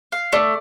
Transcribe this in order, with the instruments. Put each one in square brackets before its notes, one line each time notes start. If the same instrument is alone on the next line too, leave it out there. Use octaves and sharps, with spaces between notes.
[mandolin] F5
[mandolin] A3 [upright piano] D5